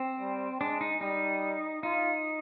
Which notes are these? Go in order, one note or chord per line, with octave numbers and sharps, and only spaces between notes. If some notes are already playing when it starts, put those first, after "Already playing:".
Already playing: C4
G3
G#3 D4
D#4
G3 D#4
D#4 F4